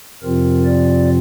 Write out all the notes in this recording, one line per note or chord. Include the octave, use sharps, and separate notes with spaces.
F2 C3 F3 C4 F4 A#4
D5